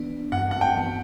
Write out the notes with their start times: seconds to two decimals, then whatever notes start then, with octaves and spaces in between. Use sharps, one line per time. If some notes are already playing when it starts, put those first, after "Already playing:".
Already playing: E3 B3 D4
0.32 G2 F#5
0.51 F#5
0.61 G5
0.76 E3 B3